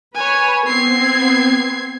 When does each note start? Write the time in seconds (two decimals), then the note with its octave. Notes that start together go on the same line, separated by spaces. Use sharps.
0.15 B4 C#5 G#5
0.67 B3 C4 G#6 C7